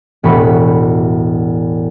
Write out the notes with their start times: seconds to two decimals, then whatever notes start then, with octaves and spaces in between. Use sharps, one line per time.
0.23 E1 A1 F#4 B5 C#6 B6